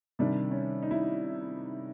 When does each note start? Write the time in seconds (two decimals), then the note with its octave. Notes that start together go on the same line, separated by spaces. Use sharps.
0.19 C3 D#3 G3 D4
0.51 C#4
0.83 D#4
0.91 E4